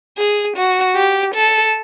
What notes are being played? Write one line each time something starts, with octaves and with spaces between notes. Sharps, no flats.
G#4
F#4
G4
A4